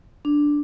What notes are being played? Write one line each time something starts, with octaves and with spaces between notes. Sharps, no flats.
D4